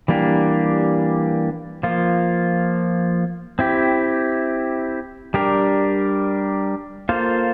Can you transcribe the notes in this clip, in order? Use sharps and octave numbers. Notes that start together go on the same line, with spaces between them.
E3 G3 A#3 D4 G4
F3 A#3 F4
C4 E4 G4
G3 D4 G4 A#4
A#3 F4 A4 C5 F5